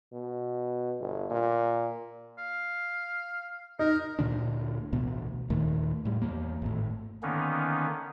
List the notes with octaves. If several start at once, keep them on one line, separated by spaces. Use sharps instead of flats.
B2
G1
A#2
F5
D#4 A#4
D2 A#2 D3 D4
A1 D2 B2 B3
D#2 A#2 D#3 A3
A2 G3
E2 A#3
G#1 A2
D3 D#3 A#3 B3 C#4 D#4